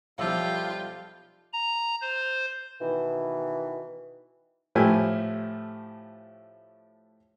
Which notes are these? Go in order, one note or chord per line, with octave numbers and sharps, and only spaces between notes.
B1 F3 G3 F4 G4 E5 G5
A#5
C5
B2 D#3 E3
A2 F3 A3 G4 G#5